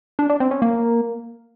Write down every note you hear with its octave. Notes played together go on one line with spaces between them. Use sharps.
D4
D4
C4
C#4
A#3